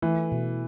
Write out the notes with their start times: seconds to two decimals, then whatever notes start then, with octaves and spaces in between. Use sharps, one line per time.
0.02 E3 A3
0.32 B2